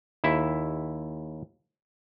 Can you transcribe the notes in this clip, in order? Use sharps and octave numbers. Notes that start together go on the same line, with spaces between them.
D#2 E4 E5